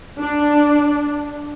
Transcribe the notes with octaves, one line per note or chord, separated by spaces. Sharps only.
D4